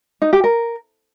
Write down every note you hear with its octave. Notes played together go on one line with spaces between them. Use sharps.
D#4
G4
A#4